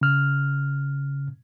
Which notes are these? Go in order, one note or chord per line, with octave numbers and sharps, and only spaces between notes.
C#3 F6